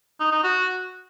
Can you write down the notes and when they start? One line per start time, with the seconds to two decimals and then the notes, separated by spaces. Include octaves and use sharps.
0.20 D#4
0.32 D#4
0.43 F#4